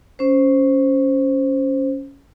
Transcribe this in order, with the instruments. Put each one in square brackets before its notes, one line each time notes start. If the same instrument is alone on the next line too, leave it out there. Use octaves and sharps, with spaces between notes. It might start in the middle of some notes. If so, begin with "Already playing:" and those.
[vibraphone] C#4 C5